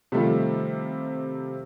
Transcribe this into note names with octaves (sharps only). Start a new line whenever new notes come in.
C3 D#3 F3 G3 A3 F4